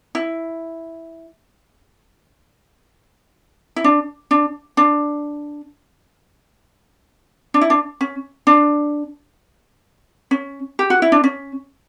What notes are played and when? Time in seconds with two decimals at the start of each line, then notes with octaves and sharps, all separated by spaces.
0.15 E4
3.76 E4
3.84 D4
4.31 D4
4.77 D4
7.54 D4
7.61 E4
7.70 D4
8.01 C#4
8.47 D4
10.31 C#4
10.79 G4
10.90 F#4
11.02 E4
11.12 D4
11.24 C#4